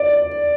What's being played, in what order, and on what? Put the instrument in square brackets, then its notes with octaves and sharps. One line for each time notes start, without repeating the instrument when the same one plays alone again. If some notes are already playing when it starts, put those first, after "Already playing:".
Already playing: [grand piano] D5